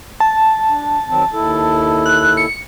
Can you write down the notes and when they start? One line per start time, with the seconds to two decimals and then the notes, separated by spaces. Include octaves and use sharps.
0.20 A5
0.68 D4
1.09 D#3 F#3 C4
1.33 D#2 E4 A4
2.06 F#6
2.37 C#7